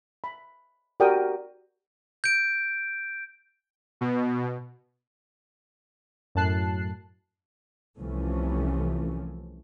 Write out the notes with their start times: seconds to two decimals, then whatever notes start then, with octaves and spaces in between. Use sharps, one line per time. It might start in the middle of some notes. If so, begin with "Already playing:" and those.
0.24 B5
1.00 F#4 G4 A#4 D5 G5 D#6
2.24 G6 D7
4.01 B2
6.35 F#2 A2 A5 F#6 C7
7.97 C2 C3 E3 F3 A3 C#4